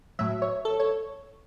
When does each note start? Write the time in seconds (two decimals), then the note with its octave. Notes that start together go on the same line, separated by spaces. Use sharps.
0.19 A2 F#3 E5
0.42 C#5
0.65 A4
0.80 C#5